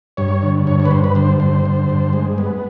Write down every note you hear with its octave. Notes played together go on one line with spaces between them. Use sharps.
G2 C#5
D3
G2 C#5
C#5
B4
G2 C5
B4
D3 C5
G2 C5
D3
G2
G#3
B3